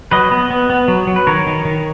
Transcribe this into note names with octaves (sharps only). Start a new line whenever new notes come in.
F#3 B4 D#5
B3
B3
B3
F#3
F#3
B4
D#3 A#4 C#5
D#3
D#3